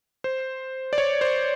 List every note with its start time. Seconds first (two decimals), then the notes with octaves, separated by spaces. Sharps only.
0.24 C5
0.93 D5
0.98 C#5
1.21 C5